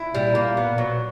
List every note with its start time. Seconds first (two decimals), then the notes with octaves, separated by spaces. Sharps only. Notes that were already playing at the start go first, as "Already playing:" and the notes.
Already playing: E4
0.14 A#2 G3
0.35 A#3
0.57 B3
0.78 F#3